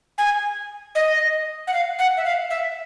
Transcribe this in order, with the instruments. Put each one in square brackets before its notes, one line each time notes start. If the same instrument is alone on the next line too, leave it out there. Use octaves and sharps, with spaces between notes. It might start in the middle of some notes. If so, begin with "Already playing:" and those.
[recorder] G#5
D#5
F#5
F5
F#5
E5
F5
E5